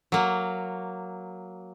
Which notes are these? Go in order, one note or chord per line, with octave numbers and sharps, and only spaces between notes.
F#3 A#3